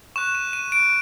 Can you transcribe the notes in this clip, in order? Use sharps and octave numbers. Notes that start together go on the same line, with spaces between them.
C#6 F#6 E7
D#7
D#7
D7